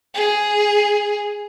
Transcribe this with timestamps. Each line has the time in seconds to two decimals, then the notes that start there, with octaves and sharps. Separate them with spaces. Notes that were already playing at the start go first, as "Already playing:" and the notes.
0.14 G#4